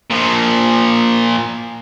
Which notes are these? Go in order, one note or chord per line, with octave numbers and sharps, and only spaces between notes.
A#2 F3